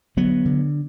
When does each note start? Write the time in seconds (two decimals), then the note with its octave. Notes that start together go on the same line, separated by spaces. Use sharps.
0.17 D3 F#3 B3
0.45 D3